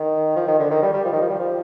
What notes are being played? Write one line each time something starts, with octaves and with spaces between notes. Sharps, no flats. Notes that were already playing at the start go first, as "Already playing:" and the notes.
Already playing: D#3
F3
D#3
D3
D#3
G3
G3
F3
D#3
F3
G3
F3